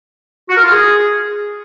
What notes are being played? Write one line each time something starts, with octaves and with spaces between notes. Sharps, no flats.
F#4
A#4
F4
G#4